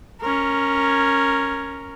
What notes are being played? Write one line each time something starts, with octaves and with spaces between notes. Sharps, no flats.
C#4 A#4